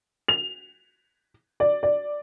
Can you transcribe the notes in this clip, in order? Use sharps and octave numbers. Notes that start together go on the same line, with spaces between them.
F7
D5
D5